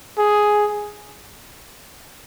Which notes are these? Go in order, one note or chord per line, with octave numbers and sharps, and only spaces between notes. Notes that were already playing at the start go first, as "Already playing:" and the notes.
G#4